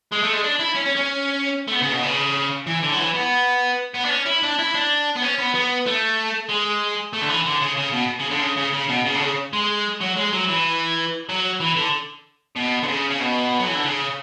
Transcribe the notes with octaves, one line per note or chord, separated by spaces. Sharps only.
G#3
A3
G#3
D4
E4
C#4
C#4
C#4
A3
B3
C#3
B2
C#3
E3
D3
F#3
E3
B3
B3
D4
C#4
E4
D4
E4
D4
B3
C#4
B3
B3
A3
G#3
A3
D3
E3
D3
C#3
C#3
B2
C#3
D3
C#3
C#3
C#3
B2
C#3
D3
C#3
G#3
F#3
G#3
F#3
E3
F#3
E3
D3
B2
D3
C#3
C#3
B2
F#3
E3
D3
C#3